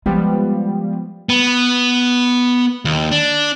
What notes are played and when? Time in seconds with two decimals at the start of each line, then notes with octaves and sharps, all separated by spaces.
0.06 F3 G3 G#3 B3
1.29 B3
2.85 D#2
3.11 D4